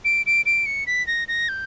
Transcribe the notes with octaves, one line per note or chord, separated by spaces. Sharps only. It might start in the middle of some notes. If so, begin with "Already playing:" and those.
D7
D7
D7
C#7
B6
A#6
A#6
G6